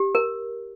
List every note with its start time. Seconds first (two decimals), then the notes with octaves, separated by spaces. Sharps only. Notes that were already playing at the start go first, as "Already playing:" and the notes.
Already playing: G4
0.15 A#4